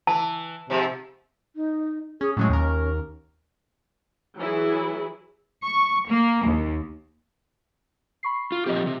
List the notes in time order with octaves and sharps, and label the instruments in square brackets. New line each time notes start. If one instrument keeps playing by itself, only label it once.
[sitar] E3 [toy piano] A5
[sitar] G#2 F3 [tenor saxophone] C3
[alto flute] D#4
[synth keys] C#4 [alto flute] G#4
[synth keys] A2 F#3 G#3 [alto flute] C#4
[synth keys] D#2 A#4
[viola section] E3 F#3 E4 G#4
[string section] C#6
A#3
D#2
[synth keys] B5 C#6 C7
[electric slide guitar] F4
[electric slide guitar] A#2 F3 G4 [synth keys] C4 D#5
[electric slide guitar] C3